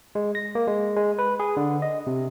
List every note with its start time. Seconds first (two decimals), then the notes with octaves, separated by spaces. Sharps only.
0.15 G#3
0.35 A#6
0.55 A#3
0.68 G#3
0.97 G#3
1.19 B4
1.40 G#4
1.57 D3
1.82 D#5
2.07 C3